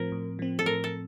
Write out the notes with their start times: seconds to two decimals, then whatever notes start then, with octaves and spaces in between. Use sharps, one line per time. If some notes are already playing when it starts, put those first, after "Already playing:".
Already playing: A2 F3 C4 A#4
0.12 A2
0.39 F3 C4
0.59 A4
0.66 A2 A#4
0.84 A4